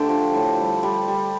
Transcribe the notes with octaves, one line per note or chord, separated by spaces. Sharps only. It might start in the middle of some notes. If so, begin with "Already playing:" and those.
Already playing: D3 A3 G4 A4 C5
F3
A2
G3
G3
G3